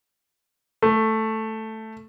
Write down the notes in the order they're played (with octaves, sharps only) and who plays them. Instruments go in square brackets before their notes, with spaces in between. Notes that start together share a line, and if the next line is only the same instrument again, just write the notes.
[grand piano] A3